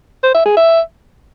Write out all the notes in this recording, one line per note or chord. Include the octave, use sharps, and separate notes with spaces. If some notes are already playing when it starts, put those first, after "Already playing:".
C5
E5
G#4
E5